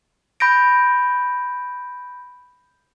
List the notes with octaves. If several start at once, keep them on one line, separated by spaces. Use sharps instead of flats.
B5 G6 A#6 D7